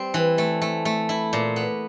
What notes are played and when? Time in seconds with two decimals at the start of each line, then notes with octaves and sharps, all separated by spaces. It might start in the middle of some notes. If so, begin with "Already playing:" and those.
Already playing: G3 C4
0.14 E3
0.38 A3
0.62 A3
0.85 A3
1.09 E4
1.33 A#2
1.56 B3